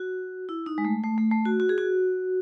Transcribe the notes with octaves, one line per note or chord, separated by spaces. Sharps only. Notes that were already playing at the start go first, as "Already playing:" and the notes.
Already playing: F#4
E4
D#4
G#3
A3
A3
A3
A3
F#4
F#4
G#4
F#4